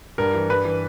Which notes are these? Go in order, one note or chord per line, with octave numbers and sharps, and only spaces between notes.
G2 A#4
E3
G2 B4
E3